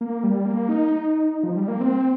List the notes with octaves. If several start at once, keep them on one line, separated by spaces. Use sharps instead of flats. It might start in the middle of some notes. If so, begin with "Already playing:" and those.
A#3
G3
A#3
D#4
F3
G3
A#3
C4